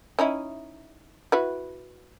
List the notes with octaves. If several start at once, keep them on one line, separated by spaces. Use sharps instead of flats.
C#4 D#4 E4
E4 F#4 B4